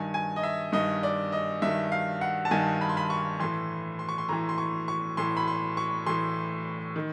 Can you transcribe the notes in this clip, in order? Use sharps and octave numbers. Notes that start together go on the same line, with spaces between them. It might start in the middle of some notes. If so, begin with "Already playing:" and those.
Already playing: G2 D#3 G#5
G#5
D#5
E5
G2 D#3 D#5
D5
D#5
G2 D#3 E5
F5
F#5
A5
G2 D#3 G#5
B5
C6
B5
C#6
A2 E3 C6
C6
C#6
C6
A2 E3 A#5
C6
C#6
C#6
A2 E3 C6
B5
C6
C#6
A2 E3 C6
D#3